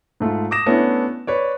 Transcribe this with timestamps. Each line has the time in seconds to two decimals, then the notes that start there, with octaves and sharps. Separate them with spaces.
0.20 G#2 A3 F4
0.51 D6 D#6 A#6 E7
0.66 A3 B3 C#4 D4 E4
1.27 B4 C#5 D5